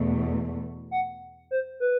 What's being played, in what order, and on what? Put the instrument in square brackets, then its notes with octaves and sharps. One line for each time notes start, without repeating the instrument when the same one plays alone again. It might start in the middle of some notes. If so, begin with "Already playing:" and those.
Already playing: [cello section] E2 B2 A3
[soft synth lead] F#5
C5
B4